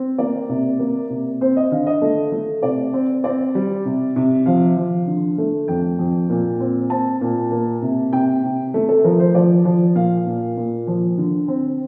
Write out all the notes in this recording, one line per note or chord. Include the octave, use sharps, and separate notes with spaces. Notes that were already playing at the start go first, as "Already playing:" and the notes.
Already playing: C4
A#3 D5
C3
A#3
C3
C4 C5
D#5
D3 F5
D#5
A3
A3
C3 D5
C4
C4 D5
G3
C3
C3
F3 F5
F3
D3
A3
F2 G5
F2
A#2
C4
C4 A5
A#2
A#3
C3
C3 G5
C3
A3
A4
F3 A#4
C5
F3 D5
F3
A#2 F5
A#2
A#2
F3
D3
C4